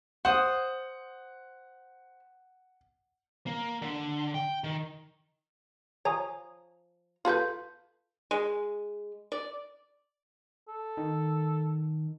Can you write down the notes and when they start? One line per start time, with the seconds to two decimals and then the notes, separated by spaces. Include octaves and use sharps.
0.25 C5 F#5 D#6
3.47 A#3
3.82 D3
4.34 G5
4.64 D#3
6.05 F3 C#5 G#5 A#5 D#6
7.25 F4 A4 B4 C6 G6
8.31 G#3
9.32 D5
10.69 A4
10.97 D#3